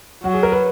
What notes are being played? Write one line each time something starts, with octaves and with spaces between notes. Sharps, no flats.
F#3 F#4
G#4
A#4
B4